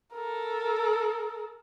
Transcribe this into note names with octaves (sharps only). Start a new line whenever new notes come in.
A4 A#4